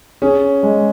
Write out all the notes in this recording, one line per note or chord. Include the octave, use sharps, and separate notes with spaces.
C#4 G#4
G#3